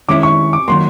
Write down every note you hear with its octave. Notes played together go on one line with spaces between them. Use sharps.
D#3 G#3 C#4 E4 D6
C#6
D6
D#3 F#3 A#3 C6